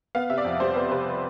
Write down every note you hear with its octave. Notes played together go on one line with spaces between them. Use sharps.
B3 F5
C3 E5
D5
F2
G3 C5
B3 B4
C3 B4